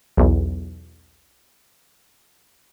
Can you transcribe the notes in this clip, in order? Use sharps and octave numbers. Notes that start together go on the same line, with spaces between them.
B1 E2